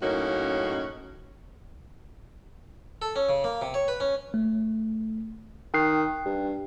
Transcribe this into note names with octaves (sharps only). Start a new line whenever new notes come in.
F#2 A2 A#3 C#4 D#4 F#4
A4
C#4
C#3
A#3
C3
C#5
B4
C#4
A3
D#3 G5 F#6 C7
G2